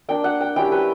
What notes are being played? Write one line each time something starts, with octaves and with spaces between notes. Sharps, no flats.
A#3 D4 G5
F#5
G5
G3 C#4 E4 G5
B4